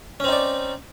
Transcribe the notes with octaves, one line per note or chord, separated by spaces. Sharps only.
C4 C#4 D#4 D5